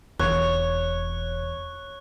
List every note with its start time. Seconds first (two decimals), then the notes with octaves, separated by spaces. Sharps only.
0.20 E1 E2 C4 C#5 F#6